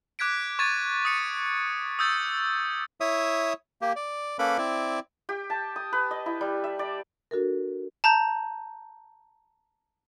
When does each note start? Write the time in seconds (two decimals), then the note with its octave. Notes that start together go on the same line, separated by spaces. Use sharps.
0.19 D6 F#6 G#6 B6 D7
0.59 C#6 D6 G#6 A6 D#7
1.05 D#6 C#7 D#7
1.99 D#6 E6 G6 A6
3.01 E4 C#5 E5 D#6
3.82 A#3 G4
3.96 D5
4.39 A#3 C#4 A4 B4 B5 D6
4.58 C4 E4 D5
5.29 G4
5.50 A5
5.76 D#6
5.93 B4
6.11 D#5
6.26 E4
6.41 G3
6.64 E5
6.79 D5
7.31 D4 F#4 A4 A#4
8.04 A5 A#5 G6